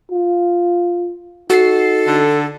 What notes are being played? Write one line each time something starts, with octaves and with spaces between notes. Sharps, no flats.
F4
D#4 F#4 A4 C7
D3